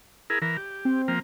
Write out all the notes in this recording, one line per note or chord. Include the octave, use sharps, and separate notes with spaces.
E4 G#4 A#4
E3 A#4
G4
C4
F3 A#3